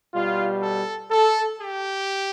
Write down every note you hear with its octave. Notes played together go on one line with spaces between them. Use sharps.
B2 G3 F4
A4
A4
G4